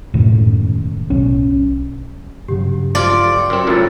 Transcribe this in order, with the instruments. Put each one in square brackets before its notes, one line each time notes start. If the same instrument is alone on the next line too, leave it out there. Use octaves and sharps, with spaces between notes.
[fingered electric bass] E1 F#2 A2 D#3
B1 C#4
[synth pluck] G2 C#3 F#3 [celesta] G4
[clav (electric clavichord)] F3 F4 [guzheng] D5
[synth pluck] G5 C6 C#7
[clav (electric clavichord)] F#2 C4
[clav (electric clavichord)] C#2 F#2 A2 [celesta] F4 A6